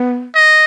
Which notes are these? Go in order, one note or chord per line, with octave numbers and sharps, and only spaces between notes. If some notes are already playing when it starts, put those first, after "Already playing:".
Already playing: B3
D#5